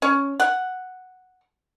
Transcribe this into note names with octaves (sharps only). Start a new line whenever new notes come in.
C#4
F#5